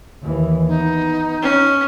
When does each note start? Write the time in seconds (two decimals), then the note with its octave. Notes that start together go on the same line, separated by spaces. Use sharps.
0.21 D#2 E3
0.68 B3 D#4
1.42 C#4